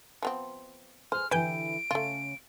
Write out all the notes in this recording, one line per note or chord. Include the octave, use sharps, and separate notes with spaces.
F3 B3 C4
G#4 B4 C5 G#5 F6
D3 E3 E4 G4 B4 G#5 G6 D7
C#3 A3 C#4 F4